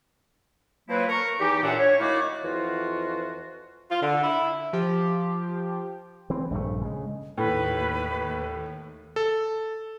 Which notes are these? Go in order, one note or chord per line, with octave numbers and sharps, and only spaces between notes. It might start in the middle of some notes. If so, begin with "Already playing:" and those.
F3 F#3 A#3 C4 E4 B4
A#4 C#6
E2 E3 D#4 G4
F#2 A#2 D4 E5 F#5
C#5
D#3 A3 E4 F#4 F5 D6
F2 E3 F4 F#4
F4
D3
E4
F3 G4
E3 C4
A#1 G2 C#3 A3
C#3 G#3
D#2 A2 B4
A4